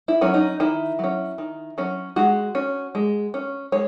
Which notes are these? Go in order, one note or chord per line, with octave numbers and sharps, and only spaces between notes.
E4
F#3 C#4
D#4
D#3 E4
F#3 C#4
D#3
F#3 C#4
G#3 F#4
C#4
G#3
C#4
G#3 C#5